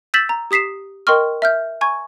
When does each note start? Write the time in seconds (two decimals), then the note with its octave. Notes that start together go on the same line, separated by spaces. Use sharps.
0.14 E6 G6 A6 B6 E7 F#7
0.29 A#5
0.51 G4 D#6 B6 C7 E7
1.07 A#4 D#5 G5 C6 C#6 F6
1.42 E5 F6 G6
1.81 G#5 A#5 C#6 G#6